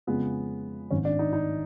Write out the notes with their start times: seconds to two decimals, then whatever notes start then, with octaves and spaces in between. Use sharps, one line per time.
0.07 F2 C#3 F3 G#3 B3
0.91 G#1 G#2 D#3 C#4
1.05 D4
1.19 D#4
1.33 D#4